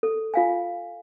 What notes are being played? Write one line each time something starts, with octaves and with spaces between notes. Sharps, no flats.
A4
F4 F5 G#5